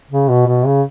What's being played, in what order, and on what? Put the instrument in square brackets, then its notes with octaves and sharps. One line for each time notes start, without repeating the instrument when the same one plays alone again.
[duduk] C#3
B2
B2
C#3